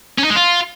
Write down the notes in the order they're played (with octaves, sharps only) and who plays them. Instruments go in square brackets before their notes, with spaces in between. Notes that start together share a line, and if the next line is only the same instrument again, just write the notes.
[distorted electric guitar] C#4
D#4
G#3
F4